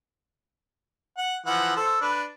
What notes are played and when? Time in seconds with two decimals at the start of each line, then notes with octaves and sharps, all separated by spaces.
1.18 F#5
1.46 E3 F3 F#5
1.76 A4 C5
2.01 D4 B4